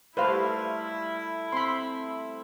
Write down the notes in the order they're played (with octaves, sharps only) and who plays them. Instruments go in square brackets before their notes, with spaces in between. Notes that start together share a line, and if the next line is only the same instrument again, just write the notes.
[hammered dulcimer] G3 A3 [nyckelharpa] E4 [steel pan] B4 C5 F5
[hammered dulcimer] C4 [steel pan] B5 C6